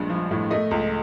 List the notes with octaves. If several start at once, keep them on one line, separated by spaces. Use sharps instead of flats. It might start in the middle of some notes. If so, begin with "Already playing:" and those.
Already playing: A#1 G2 G#3
F3
A2
A3 D#5
C#2